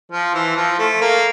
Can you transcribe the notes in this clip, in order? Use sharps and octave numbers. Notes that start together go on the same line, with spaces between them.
F3
E3
F3
A3
A#3